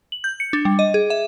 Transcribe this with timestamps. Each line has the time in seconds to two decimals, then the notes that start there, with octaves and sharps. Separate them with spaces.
0.12 F#7
0.24 G6
0.40 C#7
0.53 D4
0.65 G3
0.79 D#5
0.94 G#4
1.10 E5